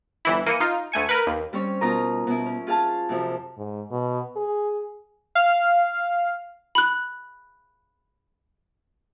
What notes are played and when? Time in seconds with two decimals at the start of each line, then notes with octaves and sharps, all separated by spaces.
0.25 G1 E3 E4
0.46 E3 A#3 C#7 D#7
0.60 D#4 F4
0.92 D2 A3 G#5 C#7
1.09 A#4 B4
1.27 D#2
1.53 G3 C4 C#4 C#5
1.81 B2 D#4 F4 A#4 A#5 D#6
2.27 B2 E4
2.46 C#4
2.67 F4 G#4 F5 A5
3.09 F#2 C3 F3
3.58 G#2
3.92 B2
4.36 G#4
5.35 F5
6.75 B5 F#6